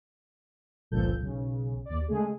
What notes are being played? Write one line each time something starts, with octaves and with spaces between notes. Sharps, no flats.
G1 C#2 A#2 F3 A4 G6
B1 C#3
D#2 D5
C#3 G#3 A3 G#4